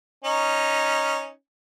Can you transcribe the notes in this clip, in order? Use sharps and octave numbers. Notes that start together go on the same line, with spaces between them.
C#4 D#4